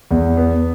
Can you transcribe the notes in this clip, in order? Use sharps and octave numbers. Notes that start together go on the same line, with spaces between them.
E2
B3